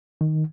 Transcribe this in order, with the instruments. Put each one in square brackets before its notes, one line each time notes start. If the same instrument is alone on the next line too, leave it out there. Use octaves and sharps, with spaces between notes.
[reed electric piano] D#3